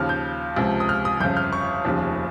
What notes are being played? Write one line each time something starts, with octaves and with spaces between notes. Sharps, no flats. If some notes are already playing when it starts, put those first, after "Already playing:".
Already playing: D#2 C#3 F3 F6
G6
C#2 C3 F3
D#6
F6
D#6
G1 F2 C#3 G6
F6
C#6
F1 D#2 C#3 F3